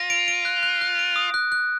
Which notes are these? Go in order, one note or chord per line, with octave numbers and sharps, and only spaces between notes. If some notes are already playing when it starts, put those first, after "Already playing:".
Already playing: F4 A#6
D7
D7
F#6
F#6
F#6
D7
D#6
F#6
F#6